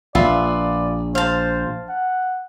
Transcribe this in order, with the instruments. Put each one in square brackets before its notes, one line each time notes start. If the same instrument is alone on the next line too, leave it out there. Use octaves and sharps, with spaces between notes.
[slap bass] A#1 [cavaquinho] F4 B4 E5 [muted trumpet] D5
[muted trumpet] C5 [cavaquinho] F5 A5
[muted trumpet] F#5